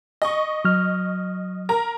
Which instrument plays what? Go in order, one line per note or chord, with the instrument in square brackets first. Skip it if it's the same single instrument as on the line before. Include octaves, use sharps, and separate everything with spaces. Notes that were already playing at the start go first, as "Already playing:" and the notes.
[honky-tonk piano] D#5 C#6
[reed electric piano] F#3 F6
[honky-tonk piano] A#4 A#5